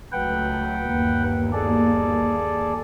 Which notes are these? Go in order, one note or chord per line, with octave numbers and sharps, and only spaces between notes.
C#2 F#3 A3 B4 F#5 G5
G1 D#2 A#3
G#4 A4 D5